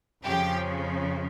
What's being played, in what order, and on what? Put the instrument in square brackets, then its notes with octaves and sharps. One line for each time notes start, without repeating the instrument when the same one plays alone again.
[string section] F2 C#3 F3 G4